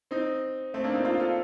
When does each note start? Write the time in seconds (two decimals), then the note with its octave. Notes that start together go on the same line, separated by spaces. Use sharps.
0.11 C4 D#4
0.74 A3 C4
0.84 A#3 D4
0.94 C4 D#4
1.05 D4 F4
1.20 F4 A4